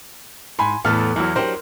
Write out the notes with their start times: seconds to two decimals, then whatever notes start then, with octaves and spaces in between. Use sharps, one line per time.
0.59 G#2 G#5 B5 C6
0.85 E2 A2 B3 A4 F6
1.16 E2 E3 F#3 E4
1.36 F#3 D4 G4 A#4 C5